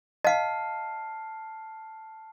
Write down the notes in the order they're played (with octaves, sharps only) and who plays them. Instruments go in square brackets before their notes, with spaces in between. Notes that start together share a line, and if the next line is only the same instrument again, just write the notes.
[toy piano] D#5 F5 [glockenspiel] A5 F6 C7